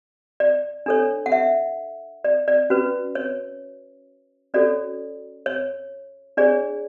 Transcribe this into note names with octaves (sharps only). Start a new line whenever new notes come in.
D5
D4 A4 C#5
F#5
E5
D5
D5
C#4 F#4 B4
C#5
C#4 F#4 A4 C#5 D5
C#5
D4 G#4 C#5 D5